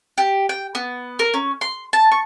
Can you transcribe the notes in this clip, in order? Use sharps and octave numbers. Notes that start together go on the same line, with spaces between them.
G4
G5
B3
A#4
C#4
C6
A5
C#6